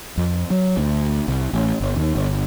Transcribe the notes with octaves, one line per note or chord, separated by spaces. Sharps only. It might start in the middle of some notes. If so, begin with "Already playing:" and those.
F2
F#3
D2
C2
A1
G1
D#2
G1